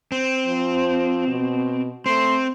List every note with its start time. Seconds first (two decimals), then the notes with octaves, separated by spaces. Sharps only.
0.12 C4
0.46 F3
1.27 B2
2.06 A3 C4 C6